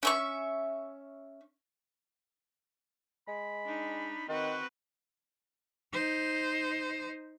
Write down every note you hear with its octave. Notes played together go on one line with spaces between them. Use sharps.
C#4 E5 C#6
G#3 B5
D4 D#4
D#3 C4 F#4 B4
D#4 C5